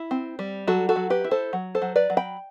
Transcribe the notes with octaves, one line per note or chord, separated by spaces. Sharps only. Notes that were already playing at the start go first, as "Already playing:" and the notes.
Already playing: E4
C4
G3
F#3 F#4 A4
F#4 A4
F#3
G4 B4
E4
A4 C5
F#3
A4 C5
F#3
B4 D5
F#3
G5 B5